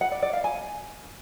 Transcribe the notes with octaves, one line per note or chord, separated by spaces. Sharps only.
F#5
D5
D5
F5
G#5